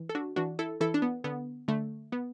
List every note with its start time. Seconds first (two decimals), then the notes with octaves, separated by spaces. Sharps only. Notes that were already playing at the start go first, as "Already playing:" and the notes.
Already playing: E3
0.09 A4
0.15 D4 F#4
0.36 E3 D4 F#4
0.59 E4 A4
0.81 E3 E4 A4
0.94 D4
1.02 B3
1.24 D3 B3
1.68 D3 A3
2.12 B3